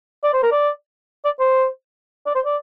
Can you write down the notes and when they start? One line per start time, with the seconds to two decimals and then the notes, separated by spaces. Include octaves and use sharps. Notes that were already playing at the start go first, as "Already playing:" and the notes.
0.24 D5
0.34 C5
0.43 A#4
0.52 D5
1.25 D5
1.40 C5
2.26 D5
2.35 C5
2.45 D5